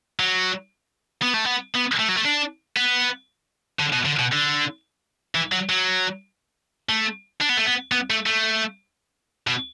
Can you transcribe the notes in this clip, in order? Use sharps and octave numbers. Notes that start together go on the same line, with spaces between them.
F#3
B3
A3
B3
B3
A3
F#3
A3
D4
B3
D3
B2
D3
B2
D3
E3
F#3
F#3
A3
D4
B3
A3
B3
B3
A3
A3
B2